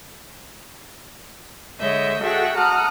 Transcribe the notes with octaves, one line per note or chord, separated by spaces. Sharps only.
D3 G#3 C#5 D#5 E5 G6
F#4 G#4 A4 E5 F#5 G5
F#5 A5 A#5 D#6 F6